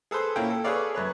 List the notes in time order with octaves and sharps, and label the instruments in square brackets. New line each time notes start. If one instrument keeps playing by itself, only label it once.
[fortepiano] G#4 A4 B4 C5
A#2 A#3 C#4 E4 G5
A4
G#4 A4 B4 C#5 D5 F5
F#2 B4 C#5